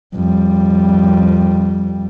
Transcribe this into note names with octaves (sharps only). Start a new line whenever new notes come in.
F2 G3